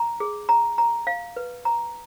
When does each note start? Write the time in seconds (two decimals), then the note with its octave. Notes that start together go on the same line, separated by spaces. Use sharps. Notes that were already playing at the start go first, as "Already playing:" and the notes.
Already playing: A#5
0.20 G#4
0.49 A#5
0.78 A#5
1.07 F5
1.36 B4
1.65 A#5